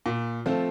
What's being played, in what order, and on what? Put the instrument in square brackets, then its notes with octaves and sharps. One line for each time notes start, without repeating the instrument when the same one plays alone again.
[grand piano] A#2
F3 A3 C4 F4